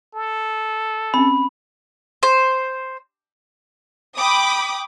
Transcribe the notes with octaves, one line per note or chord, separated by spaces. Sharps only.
A4
C4 C#4 B5
C5
G5 B5 D6 D#6